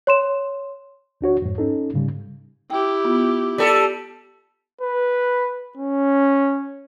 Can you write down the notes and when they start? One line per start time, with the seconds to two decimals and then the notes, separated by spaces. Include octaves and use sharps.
0.07 C#5 C6 E7
1.21 D2 D4 F#4 C#5
1.42 F2 G#2
1.58 C#4 D#4 A4
1.93 G#2 C#3 G3
2.70 E4 G4 G5
3.05 B3 F4
3.58 G3 A4
4.81 B4
5.77 C#4